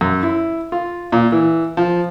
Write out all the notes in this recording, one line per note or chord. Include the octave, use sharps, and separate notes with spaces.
F#2
E4
F4
A#2
E3
F3